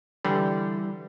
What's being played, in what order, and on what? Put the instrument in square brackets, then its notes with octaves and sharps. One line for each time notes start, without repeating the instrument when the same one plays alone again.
[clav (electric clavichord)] D3 [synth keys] E3 G3